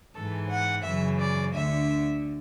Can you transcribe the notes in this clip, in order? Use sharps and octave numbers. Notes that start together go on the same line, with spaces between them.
G#2 E3 A4
F#5
F#2 C#3 E3 E5
D5
D2 D3 E5